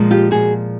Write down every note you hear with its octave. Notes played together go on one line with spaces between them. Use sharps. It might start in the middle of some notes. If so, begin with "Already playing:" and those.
Already playing: A#2 F3 G#3
F4 G4
F#4 G#4